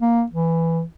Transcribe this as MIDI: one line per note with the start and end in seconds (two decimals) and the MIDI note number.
0.01 0.24 58
0.31 0.83 52